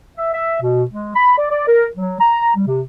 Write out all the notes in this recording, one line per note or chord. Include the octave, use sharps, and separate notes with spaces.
E5
E5
B2
G#3
B5
D5
D5
A#4
F#3
A#5
G3
C3